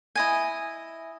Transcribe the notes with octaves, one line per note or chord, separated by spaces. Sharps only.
E4 D#5 G#5